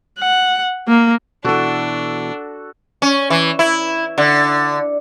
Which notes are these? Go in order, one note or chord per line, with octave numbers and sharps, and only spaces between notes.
F#5
A#3
B2 E3 D4 F#4 A4
C#4
E3
E4
D3